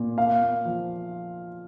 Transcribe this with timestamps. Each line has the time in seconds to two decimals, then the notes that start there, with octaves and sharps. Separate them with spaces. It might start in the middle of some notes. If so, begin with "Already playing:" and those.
Already playing: A#2
0.18 A#3 F5
0.41 A#3
0.65 F3